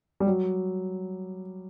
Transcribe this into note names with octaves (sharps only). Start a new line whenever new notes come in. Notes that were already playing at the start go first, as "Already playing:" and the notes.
G3
F#3